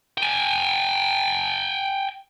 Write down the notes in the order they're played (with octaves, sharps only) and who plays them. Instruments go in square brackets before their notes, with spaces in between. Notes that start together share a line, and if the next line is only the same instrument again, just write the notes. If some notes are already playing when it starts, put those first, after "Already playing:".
[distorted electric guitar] G5 G#5